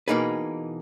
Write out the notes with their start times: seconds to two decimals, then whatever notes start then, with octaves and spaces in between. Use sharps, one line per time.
0.08 B2 E3 A#3 D#4 G#4 B4